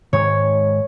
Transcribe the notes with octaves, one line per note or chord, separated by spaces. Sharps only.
G#2 D#3 G#3 C#5